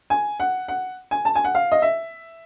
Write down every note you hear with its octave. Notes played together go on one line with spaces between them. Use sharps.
G#5
F#5
F#5
G#5
A5
G#5
F#5
F5
D#5
E5